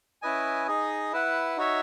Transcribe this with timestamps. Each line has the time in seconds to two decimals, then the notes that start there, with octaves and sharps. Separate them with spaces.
0.22 C#4 E4 B4 D#5 G#5
0.67 D#4 G#4 D#5
1.12 E4 B4 F#5
1.57 D#4 F#4 C#5 E5